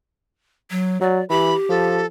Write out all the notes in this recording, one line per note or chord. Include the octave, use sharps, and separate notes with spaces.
F#3
F#3 D5
E3 G4 B5
F3 A4